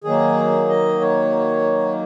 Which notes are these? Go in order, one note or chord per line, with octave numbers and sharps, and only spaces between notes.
D#3 F#3 A#3 G#4
D#5
C#5